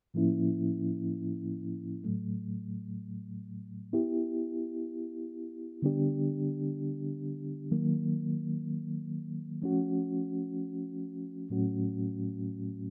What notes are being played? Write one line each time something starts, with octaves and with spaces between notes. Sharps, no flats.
A2 F3 A#3 C#4 E4
A2 F#3 A3
B3 E4 G4
D3 G3 B3 D4 G4
D#3 F#3 A#3
F3 A3 C#4 F#4
A2 F#3 A3 C#4 F#4